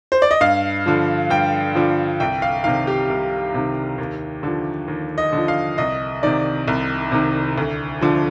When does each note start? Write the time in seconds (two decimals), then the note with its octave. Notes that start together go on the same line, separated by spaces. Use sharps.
0.12 C5
0.22 D5
0.31 D#5
0.41 G2 F5
0.86 D3 F3
1.30 G2 G5
1.75 D3 F3
2.20 C2 G5
2.42 F5
2.64 C3 D#3 F5
2.87 G4
3.09 C2
3.54 C3 D#3
3.98 D#2
4.43 D3 F3
4.88 D#2
5.18 D#5
5.33 D3 F3
5.48 F5
5.78 C2 D#5
6.23 C3 D#3 D5
6.68 C2
7.12 C3 D#3
7.58 D2
8.01 D3 F3